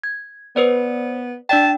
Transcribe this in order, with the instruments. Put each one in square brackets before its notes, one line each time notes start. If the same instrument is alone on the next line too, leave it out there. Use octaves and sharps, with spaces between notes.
[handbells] G#6
[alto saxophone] B3 [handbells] B4 C5 D5
[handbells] D4 D5 G5 [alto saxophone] A5